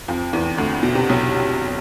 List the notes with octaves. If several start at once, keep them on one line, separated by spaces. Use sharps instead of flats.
F2 F3
E2 E3
D2 D3
B2
C3
B1 B2